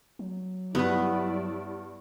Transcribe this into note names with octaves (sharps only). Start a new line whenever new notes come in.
F#3
G2 B3 E4 B4 D5